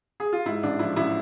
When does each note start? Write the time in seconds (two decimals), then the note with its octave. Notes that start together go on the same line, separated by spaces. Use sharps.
0.20 G#4
0.33 F4
0.46 G#2 E4
0.63 A1 D4
0.79 F3 E4
0.96 A1 E4